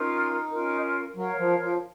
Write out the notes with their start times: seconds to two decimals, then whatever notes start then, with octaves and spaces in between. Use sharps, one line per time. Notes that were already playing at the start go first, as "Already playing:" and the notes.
Already playing: C#4 D#4 F4 A#4
0.50 C#4 F4 A#4
1.16 F#3 A#4 C#5 F5
1.38 F3
1.60 F3